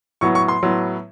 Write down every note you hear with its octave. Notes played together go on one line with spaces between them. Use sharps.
A2 F#3 B3 C#6
C#6
C6
A2 F#3 B3